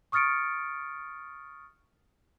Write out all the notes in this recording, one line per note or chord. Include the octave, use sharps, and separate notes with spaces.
C#6 D#6 F6 A6 C#7 D7